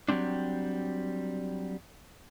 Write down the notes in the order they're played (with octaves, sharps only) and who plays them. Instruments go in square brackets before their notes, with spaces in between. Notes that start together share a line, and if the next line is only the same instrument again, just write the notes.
[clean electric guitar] F#3 G3 A3 C4 D4